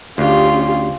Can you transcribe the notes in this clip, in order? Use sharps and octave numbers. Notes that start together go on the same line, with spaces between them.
D2 C#4 F4 G4 G#4